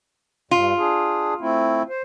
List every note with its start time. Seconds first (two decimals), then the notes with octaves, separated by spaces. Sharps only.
0.51 G2 F4
0.79 D4 G#4
1.41 A3 C4 E4
1.90 C5